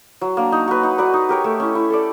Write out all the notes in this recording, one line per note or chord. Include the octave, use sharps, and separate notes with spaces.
F#3
A#3 D4
D#4
F#4 B4
D#4
F#4 B4 D5
D#4
G4 A#4 C#5
A3
C#4 E4
E4
A4 D5